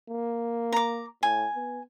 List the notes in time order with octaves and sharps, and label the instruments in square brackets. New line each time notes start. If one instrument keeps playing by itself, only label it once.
[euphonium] A#3
[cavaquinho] A#5 D6
[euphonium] A2 [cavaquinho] G#5
[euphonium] B3